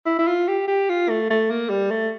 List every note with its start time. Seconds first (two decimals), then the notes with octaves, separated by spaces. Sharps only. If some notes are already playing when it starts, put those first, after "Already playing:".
0.06 E4
0.19 E4
0.27 F4
0.48 G4
0.68 G4
0.89 F4
1.10 A3
1.30 A3
1.50 A#3
1.70 G3
1.91 A3